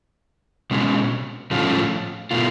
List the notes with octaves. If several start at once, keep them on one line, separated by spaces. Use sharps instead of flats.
B2 G#3 C#4
A2 F3 A3 C#4 F4
B2 A3 F4